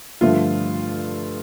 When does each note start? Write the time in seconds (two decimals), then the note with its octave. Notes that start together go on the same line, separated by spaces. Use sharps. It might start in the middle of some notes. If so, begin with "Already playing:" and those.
0.21 G2 D3 F3 A3 F4